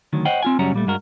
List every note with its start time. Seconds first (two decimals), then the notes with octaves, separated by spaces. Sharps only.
0.13 D2 D#3 F#3
0.25 C5 C#5 D#5 F#5 G5
0.43 C4 F4 G#5
0.59 F#2 C#3 G3 C#4 F#4 A#5
0.74 A#2 G3 A3
0.87 G2 G#3 F#4 A#4